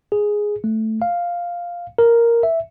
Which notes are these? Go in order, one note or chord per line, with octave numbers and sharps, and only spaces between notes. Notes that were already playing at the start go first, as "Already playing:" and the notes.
G#4
A3
F5
A#4
E5